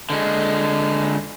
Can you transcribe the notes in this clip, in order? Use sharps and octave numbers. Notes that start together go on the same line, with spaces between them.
D3 G#3